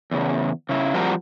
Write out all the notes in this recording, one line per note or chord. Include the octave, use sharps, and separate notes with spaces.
E2 C#3
C#3 E4
F3 G3 C4 F#4 A#4